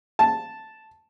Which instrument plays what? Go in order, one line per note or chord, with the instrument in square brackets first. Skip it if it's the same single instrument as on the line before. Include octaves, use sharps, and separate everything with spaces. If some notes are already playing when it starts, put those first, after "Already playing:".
[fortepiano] A5